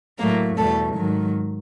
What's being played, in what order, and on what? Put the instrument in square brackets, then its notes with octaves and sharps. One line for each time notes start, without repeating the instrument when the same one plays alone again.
[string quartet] A2 F#3 A3 A#3 A#4
E2 B2 G3 A3 A4
G#2 D#3 F#3